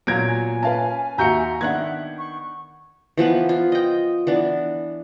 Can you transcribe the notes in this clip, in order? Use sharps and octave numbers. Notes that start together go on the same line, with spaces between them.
A#2 F#3 B3 G#6 A#6 D7
G#5
C#4 B4 F5 A5
D#2 F#4 E5 A#5 G6 C#7
D#3 B3 D4 E5 F#5 F#6 G#6
C#6
E3 F3 B3 B4
F4
D#5 G5
E3 B3 D4